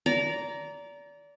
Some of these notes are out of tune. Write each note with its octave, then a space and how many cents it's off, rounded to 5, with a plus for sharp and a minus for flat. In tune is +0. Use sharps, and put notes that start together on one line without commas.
D5 -25 A#5 +0